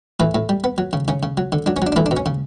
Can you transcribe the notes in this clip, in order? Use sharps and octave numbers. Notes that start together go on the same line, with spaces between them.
A2 E3 E4
A2
G3
B3
F#3
C#3
C#3 C#4
C#3
F#3
D3
F#3 D4
C#4
F#3 D4
D4
E3 A3 E4
D4
B2
C#4
C#3